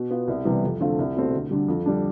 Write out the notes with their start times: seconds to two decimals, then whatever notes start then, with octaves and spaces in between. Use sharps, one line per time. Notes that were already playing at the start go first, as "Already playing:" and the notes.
Already playing: B2
0.10 B3 F4
0.28 C2
0.45 C3 E3 G3 B3
0.63 F2
0.80 D3 A3 C4 F4
0.99 C2
1.16 B2 A3 C4
1.33 D2
1.51 D3 G3
1.68 F2
1.86 D3 G3 D4